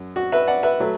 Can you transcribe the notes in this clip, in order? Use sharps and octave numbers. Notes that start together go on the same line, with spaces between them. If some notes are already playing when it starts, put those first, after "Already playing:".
Already playing: F#2
F#4
B4 E5
D5 F#5
B4 E5
F#3 A3